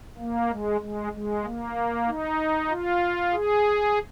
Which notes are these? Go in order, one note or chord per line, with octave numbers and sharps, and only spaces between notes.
A#3
G#3
G#3
G#3
A#3
D#4
F4
G#4